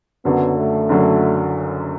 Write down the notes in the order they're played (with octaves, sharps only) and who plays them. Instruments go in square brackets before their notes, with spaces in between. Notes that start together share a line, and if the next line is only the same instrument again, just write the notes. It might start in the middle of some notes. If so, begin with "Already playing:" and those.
[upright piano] F#1 F#2 D3 F#3 [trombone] B3
[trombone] A3
[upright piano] F#1 F#2 D3 F#3